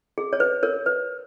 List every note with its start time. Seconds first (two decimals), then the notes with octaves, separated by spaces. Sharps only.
0.18 G#4
0.33 C#5
0.40 B4
0.63 A#4 C#5
0.86 B4